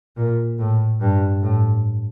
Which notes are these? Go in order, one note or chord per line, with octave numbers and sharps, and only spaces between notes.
A#2
A2
G2
A2